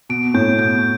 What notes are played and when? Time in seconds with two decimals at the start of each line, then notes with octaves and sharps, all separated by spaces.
0.09 B2 D7
0.34 A2 G6
0.58 B2 G6